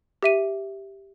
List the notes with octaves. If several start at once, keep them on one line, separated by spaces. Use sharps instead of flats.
G4 E5 D#7